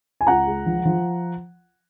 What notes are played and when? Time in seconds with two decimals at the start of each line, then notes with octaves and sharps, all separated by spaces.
0.21 G#5
0.27 C#2 F#5 A#5
0.47 G#3
0.66 F3
0.86 F3